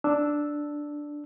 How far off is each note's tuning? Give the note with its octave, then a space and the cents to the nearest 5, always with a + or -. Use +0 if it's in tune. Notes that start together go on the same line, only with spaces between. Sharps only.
D4 +0 E6 -5